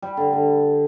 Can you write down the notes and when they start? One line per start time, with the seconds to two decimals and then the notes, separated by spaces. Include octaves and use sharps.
0.02 G3
0.17 D3
0.33 D3